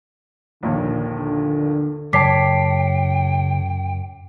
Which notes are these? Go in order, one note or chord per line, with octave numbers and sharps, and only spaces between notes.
A#1 D#2 A#2 D3
D3
F#2 C#3 C#5 G5 A5 D6 B6 C7